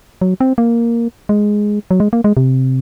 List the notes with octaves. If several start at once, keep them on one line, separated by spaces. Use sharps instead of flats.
F#3
C4
A#3
G#3
F#3
G#3
A#3
G#3
C3